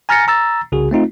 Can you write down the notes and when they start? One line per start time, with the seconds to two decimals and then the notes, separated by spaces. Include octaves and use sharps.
0.09 G#5 A#5 F6 A6 A#6 C#7
0.28 A#5 E6 A6
0.72 C2 C#3 F#4 G#4
0.91 A3 C4 D#4 F4